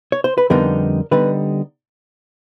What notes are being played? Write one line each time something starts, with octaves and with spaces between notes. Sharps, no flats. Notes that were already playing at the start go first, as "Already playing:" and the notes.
C#5
C5
B4
F2 D3 G3 B3 D#4 A#4
D3 G3 B3 D#4 B4